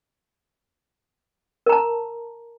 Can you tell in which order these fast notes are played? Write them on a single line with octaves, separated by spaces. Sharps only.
A#4 A#5 A5